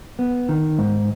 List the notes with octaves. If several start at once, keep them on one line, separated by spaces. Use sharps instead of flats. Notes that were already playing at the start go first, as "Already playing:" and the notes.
B3
D#3
G#2